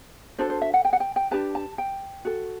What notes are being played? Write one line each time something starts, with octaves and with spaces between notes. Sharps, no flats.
D4 F#4 A4 C5
C5
E5
F#5
G5
F#5
G5
G5
D4 G4 B4 A5
A5
G5
F#4 A4